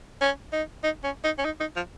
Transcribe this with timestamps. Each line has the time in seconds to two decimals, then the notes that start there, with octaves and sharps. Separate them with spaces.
0.21 C#4
0.53 D#4
0.83 D#4
1.04 C#4
1.24 D#4
1.38 C#4
1.45 D#4
1.60 D#4
1.76 F3